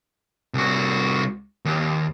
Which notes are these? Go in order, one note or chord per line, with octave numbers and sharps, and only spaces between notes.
C2 F#4
D#2